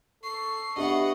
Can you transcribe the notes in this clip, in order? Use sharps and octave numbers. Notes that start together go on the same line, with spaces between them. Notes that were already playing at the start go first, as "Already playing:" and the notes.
A4 C#6 C7
B3 D4 G4 D#5 E5 F#5